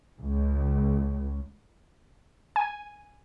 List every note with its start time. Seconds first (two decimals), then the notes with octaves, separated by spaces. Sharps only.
0.19 C#2
2.56 G#5